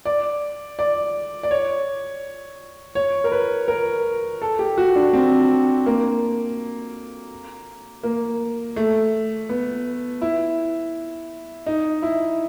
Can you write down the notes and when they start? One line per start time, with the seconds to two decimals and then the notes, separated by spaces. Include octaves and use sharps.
0.05 D5
0.79 D5
1.43 D5
1.51 C#5
2.95 C#5
3.24 A#4
3.32 B4
3.68 A#4
4.42 A4
4.59 G4
4.78 F#4
4.96 D4
5.13 C4
5.86 A#3
8.03 A#3
8.76 A3
9.49 B3
10.22 E4
11.66 D#4
12.02 E4